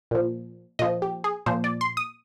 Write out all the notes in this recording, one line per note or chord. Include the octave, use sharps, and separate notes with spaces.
A#2 F3
A#2 F3 D#5
G4
G#4
A#2 F3 C5
D5
C6
D#6